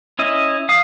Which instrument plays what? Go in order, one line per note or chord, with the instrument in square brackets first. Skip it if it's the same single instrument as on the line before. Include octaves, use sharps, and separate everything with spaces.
[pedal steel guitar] C#4 E4 D#5
F5 D#6